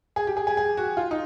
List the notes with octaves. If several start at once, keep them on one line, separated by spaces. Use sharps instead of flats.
G#4
G4
G#4
G#4
G#4
F#4
F4
D#4